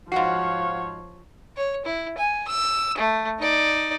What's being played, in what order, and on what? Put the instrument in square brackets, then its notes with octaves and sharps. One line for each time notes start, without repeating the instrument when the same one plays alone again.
[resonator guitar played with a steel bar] G#2 F#4 [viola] F3 C#5 [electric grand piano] F5 F#5 C7
[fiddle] C#5
E4
G#5
E6
A3
D#4 D5